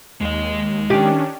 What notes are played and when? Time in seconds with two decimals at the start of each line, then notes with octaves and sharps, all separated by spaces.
0.21 D#2 G#3 D#5
0.90 D#3 C#4 D4 G4